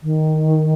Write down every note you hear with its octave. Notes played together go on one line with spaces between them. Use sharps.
D#3